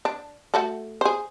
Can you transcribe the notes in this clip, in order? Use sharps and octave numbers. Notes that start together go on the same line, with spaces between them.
D4
A3 F#4 A4
G#4 C5